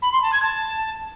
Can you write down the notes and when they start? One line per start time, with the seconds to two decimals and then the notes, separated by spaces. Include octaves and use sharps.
0.02 B5
0.12 C6
0.22 A5
0.32 G#6
0.42 A5